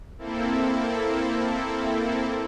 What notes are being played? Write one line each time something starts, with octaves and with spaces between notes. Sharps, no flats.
A#3 C4 E4 A4